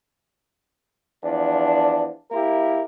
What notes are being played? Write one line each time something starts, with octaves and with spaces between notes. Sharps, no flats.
E2 F3 D4
A#3 E4 G4 A#4